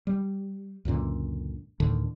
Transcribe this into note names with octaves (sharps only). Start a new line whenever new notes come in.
G3
C#2 F#2 A#2 D3
D2 A2 D3 D#3